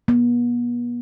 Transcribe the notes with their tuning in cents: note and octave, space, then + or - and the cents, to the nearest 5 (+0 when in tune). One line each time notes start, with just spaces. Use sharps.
B3 -40